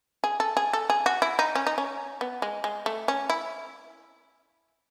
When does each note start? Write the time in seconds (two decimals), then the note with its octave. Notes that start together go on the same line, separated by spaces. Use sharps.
0.24 G#4
0.40 A4
0.57 G#4
0.73 A4
0.90 G#4
1.06 F#4
1.22 E4
1.39 D#4
1.55 C#4
1.67 D#4
1.78 C#4
2.21 B3
2.42 G#3
2.64 G#3
2.86 A3
3.08 C#4
3.30 E4